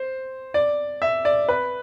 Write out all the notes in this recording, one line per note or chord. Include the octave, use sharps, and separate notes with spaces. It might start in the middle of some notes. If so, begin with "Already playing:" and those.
Already playing: C5
D5
E5
D5
B4